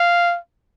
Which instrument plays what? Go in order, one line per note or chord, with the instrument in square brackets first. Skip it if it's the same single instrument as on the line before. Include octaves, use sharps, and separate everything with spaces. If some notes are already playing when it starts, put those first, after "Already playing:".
Already playing: [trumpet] F5